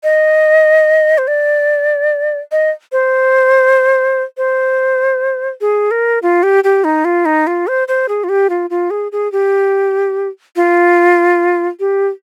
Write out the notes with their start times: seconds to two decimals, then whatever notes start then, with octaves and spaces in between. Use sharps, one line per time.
0.04 D#5
1.18 C5
1.28 D5
2.52 D#5
2.92 C5
4.37 C5
5.61 G#4
5.91 A#4
6.22 F4
6.43 G4
6.64 G4
6.84 D#4
7.05 F4
7.25 D#4
7.47 F4
7.67 C5
7.88 C5
8.09 G#4
8.24 F4
8.29 G4
8.50 F4
8.70 F4
8.90 G#4
9.12 G#4
9.32 G4
10.56 F4
11.80 G4